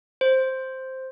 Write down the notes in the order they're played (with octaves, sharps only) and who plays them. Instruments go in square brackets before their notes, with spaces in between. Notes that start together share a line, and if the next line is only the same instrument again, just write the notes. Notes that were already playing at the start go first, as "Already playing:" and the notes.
[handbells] C5